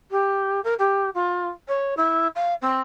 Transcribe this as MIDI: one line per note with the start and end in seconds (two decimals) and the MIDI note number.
0.11 0.60 67
0.64 0.74 70
0.79 1.10 67
1.15 1.49 65
1.68 1.94 73
1.97 2.27 64
2.36 2.54 77
2.62 2.81 60